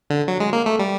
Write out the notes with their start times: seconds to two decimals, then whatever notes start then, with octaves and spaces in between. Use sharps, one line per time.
0.10 D3
0.28 F#3
0.40 G#3
0.53 A#3
0.66 A3
0.79 G3